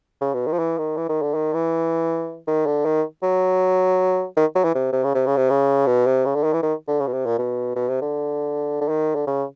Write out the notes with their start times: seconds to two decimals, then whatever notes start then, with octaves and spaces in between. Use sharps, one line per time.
0.21 C#3
0.34 B2
0.47 D#3
0.53 F3
0.59 E3
0.78 D#3
0.97 E3
1.09 D#3
1.22 D3
1.34 D#3
1.54 E3
2.47 D#3
2.66 D3
2.85 D#3
3.23 F#3
4.37 D#3
4.55 F#3
4.64 E3
4.75 C3
4.92 C3
5.04 C#3
5.15 C3
5.27 C#3
5.37 C3
5.50 C#3
5.87 B2
6.06 C3
6.25 C#3
6.35 D3
6.43 D#3
6.53 E3
6.63 D#3
6.88 D3
7.00 C#3
7.07 B2
7.13 C3
7.26 A#2
7.38 B2
7.76 B2
7.89 C3
8.01 D3
8.81 D3
8.89 D#3
9.15 D3
9.27 C#3